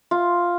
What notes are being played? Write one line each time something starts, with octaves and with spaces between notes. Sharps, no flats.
F4